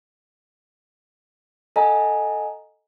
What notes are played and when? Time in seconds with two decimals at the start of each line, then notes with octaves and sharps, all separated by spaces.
1.76 A4 D#5 F#5 G#5 A#5